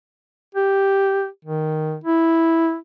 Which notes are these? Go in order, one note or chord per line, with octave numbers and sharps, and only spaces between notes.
G4
D#3
E4